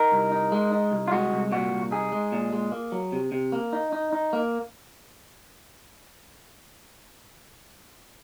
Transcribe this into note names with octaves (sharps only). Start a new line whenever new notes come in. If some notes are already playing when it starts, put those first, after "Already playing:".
Already playing: D#4 A#4
C2
D#4
G#3
D#4
C2
F4
G#3 F#4
C2
A#2 F#4
C2
D#4 G#4
G#3
A#2
G#3
A#3
F#3
C3
C3
A#3
D#4
D#4
D#4
A#3